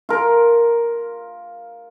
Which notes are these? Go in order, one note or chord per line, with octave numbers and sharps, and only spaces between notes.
F4 A#4